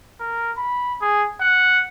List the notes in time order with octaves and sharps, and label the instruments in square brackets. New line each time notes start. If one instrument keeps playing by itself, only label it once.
[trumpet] A#4
B5
G#4
F#5